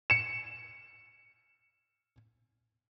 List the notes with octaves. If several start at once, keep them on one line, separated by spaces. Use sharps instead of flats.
C#7 E7